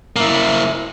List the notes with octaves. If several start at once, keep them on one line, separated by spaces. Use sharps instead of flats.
A#3 E4